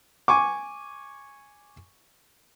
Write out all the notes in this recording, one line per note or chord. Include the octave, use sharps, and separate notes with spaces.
G#5 C#6 D6